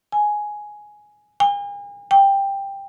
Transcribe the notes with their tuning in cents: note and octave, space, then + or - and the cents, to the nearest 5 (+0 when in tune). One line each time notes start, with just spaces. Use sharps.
G#5 +5
G#5 -40
G5 +10